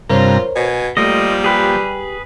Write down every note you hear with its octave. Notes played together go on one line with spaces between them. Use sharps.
G2 C3 F4 A#4 C5 C#5 A#5
B2 G#5
F3 G3 A3 A#3 D#5
G4 G#4 B4